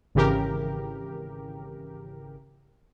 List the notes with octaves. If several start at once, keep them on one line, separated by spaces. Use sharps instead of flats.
G#1 C#3 E3 G4 A#4